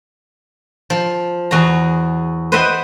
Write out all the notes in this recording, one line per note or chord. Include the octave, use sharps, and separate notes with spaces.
F3
E2 F#4 G#4 A#5
B4 C5 D#5 E5 F#5 G5